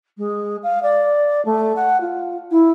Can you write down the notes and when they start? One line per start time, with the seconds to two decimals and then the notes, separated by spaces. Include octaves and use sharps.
0.17 G#3
0.63 F5
0.82 D5
1.45 A3
1.76 F#5
2.00 F4
2.51 E4